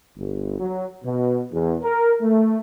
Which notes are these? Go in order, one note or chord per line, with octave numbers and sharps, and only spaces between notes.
G1
F#3
B2
E2
A#4
A3